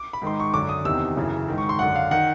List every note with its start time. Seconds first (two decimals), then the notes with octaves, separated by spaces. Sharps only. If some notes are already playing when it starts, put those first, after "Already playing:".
Already playing: D6
0.13 B5
0.22 G#2 D#3 C6
0.40 C#6
0.54 F#2 D3 D6
0.69 D#6
0.85 E2 C3 D#3 E6
1.17 F#2 C#3 E3
1.48 G#2 D#3
1.58 C#6
1.69 C6
1.79 F#2 D3 F#5
1.96 F5
2.11 D#3 F#5